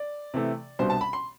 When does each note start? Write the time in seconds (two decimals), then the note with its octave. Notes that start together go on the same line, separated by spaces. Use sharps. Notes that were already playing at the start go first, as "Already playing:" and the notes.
Already playing: D5
0.34 C3 E3 A3
0.79 C2 B2 G3 D4 C5
0.90 A5
1.01 B5
1.13 C6